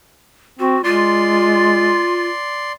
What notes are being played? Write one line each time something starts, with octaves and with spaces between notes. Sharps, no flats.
C4 F#4
G#3 F4 D5 C6